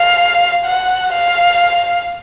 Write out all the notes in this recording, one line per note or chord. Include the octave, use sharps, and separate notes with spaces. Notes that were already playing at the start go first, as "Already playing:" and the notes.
Already playing: F5
F#5
F5